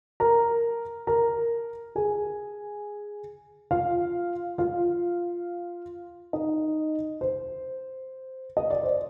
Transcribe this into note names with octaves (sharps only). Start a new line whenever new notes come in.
A#4 A#5
A#4 A#5
G#4 G#5
F4 F5
F4 F5
D#4 D#5
C5
D#5
D5
C5